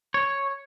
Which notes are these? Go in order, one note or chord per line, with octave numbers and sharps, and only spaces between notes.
C#5